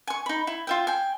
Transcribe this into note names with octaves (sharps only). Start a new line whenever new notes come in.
G#5 C#6
D#4 B5
E4
F4 E5 G5
G5 G#5